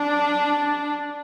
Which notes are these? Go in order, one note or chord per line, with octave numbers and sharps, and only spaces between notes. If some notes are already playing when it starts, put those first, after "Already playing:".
Already playing: D4